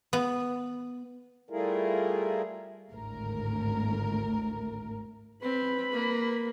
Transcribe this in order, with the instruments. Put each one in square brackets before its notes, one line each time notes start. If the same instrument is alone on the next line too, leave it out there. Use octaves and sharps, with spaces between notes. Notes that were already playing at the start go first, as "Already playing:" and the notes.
[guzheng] B3
[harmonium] G3 A3 E4 F4 G#4 A#4
[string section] G#1 D2 A2 A#4
[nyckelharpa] C4 [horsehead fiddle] B4 B5
[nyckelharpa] A#3